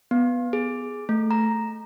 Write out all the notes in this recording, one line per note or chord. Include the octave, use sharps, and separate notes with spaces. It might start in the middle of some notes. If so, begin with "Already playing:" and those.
B3
G#4
A3
A#5